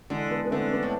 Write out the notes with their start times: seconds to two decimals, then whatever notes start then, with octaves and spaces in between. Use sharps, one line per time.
0.10 D3 E3 G#3
0.30 G#3 B3
0.45 B3
0.51 D3 A3 C4
0.72 B3 D4
0.83 A2